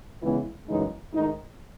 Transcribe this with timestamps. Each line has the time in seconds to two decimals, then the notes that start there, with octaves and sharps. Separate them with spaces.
0.21 C#3 E3 G#3 B3 E4
0.67 F#2 C#3 E3 G#3 D#4
1.13 G#2 D#3 A3 D#4